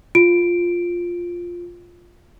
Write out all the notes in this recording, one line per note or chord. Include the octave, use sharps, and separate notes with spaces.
F4 D7